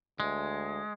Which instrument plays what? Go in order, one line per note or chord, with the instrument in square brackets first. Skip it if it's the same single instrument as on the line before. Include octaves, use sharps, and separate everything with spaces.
[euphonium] D2 [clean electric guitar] G#3